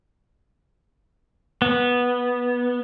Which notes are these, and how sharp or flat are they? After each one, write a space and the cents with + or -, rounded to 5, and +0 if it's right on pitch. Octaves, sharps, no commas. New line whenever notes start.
B3 -10